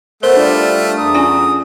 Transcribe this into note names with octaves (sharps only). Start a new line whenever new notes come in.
A3 B3 A#4 C5
G3 D4 F4
E2 A#5 D#6
C#4 F4 G#5